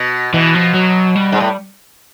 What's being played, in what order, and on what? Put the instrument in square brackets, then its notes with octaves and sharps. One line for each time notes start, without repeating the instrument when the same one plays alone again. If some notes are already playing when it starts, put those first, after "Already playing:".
Already playing: [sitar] B2
[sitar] B2 [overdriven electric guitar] E3
[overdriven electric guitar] F3
F#3
G3
[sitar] G#2
A2